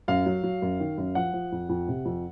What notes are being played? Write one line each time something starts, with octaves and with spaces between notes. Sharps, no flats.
F#2 F5
F#3
F#3
F#2
D#3
F#2
F3 F#5
F3
F2
F2
C3
F2